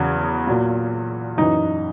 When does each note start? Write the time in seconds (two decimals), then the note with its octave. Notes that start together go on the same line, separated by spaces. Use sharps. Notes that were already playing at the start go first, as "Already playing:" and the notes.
Already playing: E2 C#3 F#3
0.47 A#2 F#3
1.38 F#2 E3 D#4